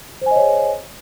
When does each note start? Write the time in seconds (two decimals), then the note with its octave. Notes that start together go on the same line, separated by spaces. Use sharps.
0.21 C5
0.26 G#5
0.31 D#5
0.36 C#5
0.41 G#4